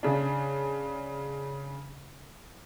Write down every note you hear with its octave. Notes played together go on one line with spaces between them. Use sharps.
C#3 D4